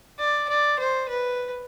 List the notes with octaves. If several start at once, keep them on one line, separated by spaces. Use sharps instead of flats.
D5
D5
C5
B4